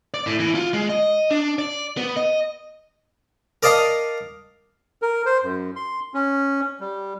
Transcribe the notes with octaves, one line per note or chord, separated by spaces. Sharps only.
D5
A2
E3
F4
G#3
D#5
D4
D5
B3
D#5
A#4 D5 D#5 F5 A5 D#6
A#4
C5
F#2
C6
C#4
G3